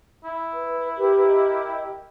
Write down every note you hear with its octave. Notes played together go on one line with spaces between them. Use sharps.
E4
B4
G4 A#4
D#5